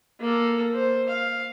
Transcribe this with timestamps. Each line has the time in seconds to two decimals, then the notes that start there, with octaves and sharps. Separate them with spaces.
0.20 A#3 A4
0.74 C5
1.09 F5